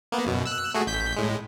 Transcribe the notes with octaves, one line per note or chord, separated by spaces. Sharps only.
A#3 B3
F#2 B2
E6 F#6
A3 F#4 G#4
A1 G6 B6
A2 G#3